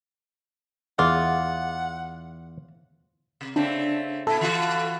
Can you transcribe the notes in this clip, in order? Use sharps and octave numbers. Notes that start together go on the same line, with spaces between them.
E2 F4 G#4 F#5
C3
C#3 A3 C4 D4
A#2 E4 A4
E3 F4 F#4